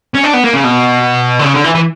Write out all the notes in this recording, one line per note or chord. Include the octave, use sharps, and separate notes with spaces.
C#4
D4
B3
A#3
C#3
B2
D3
C#3
D3
E3
E3